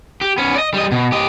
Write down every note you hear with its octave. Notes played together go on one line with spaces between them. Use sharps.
G4
B3 C#4
D5 D#5
G3 D#5
B2
G4 D#5